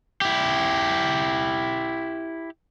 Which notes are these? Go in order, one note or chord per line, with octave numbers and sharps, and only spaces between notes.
E4 G4